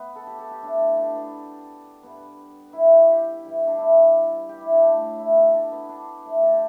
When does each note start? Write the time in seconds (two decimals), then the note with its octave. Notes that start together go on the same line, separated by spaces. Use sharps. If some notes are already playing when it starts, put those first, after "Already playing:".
Already playing: B3
0.15 A4
0.27 G4
0.39 A4
0.51 G4
0.62 A2 A3 D4
0.97 D4
1.15 B3
2.03 G2 G3 B3
2.73 E4
2.91 G4
3.09 G4
3.43 G2 E3 G3
3.67 D4
3.78 E4
4.49 G4
4.61 E4
4.72 D4
4.85 A2 A3
5.20 E4
5.37 B3
5.54 D4
5.72 B3
5.89 D4
6.25 A2 E3 A3
6.42 A4
6.52 G4